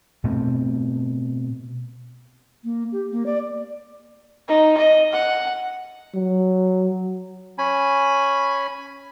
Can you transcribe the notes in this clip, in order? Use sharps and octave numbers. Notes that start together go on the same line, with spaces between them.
B2 A3 C4
A#3
G4
A#3
D5
D#4
D#5
F#5
F#3
C#4 G#5 B5